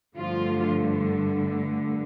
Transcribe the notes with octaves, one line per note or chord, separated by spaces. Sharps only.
G2 D3 F3 A3 F4